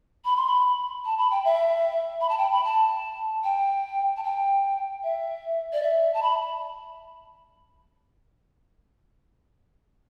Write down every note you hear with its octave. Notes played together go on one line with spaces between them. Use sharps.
B5
C6
B5
A5
B5
G5
E5
B5
A5
G5
B5
A5
G5
A5
G5
E5
D5
E5
A5
B5